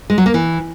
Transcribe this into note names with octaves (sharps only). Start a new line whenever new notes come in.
G#3
F#3
A#3
E3